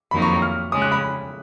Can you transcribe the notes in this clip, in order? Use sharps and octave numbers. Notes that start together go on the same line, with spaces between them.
F2 D#3 F#3 A#3 D#4 B5
C#6
F6
C#3 G#3 C#4 D#6
F#6
B5